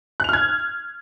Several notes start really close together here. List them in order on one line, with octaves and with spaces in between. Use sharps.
F#6 F7 F6 G#6